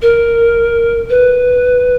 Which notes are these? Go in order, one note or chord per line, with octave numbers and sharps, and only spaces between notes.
A#4
B4